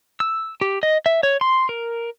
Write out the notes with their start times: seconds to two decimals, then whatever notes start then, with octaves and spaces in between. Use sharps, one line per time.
0.20 E6
0.61 G4
0.83 D#5
1.06 E5
1.23 C#5
1.41 C6
1.69 A#4